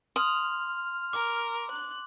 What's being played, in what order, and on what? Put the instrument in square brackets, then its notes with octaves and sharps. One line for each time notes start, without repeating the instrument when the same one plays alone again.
[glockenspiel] C6 [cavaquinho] D#6 [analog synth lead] F6
[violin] A#4 [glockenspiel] D6
[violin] F#6